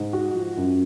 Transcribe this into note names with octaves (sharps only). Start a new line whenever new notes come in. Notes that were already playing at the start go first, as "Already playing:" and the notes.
Already playing: G#2
F#4
F3
F#2